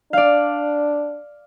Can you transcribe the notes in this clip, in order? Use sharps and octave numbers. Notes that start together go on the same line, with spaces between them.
D4 D5 F5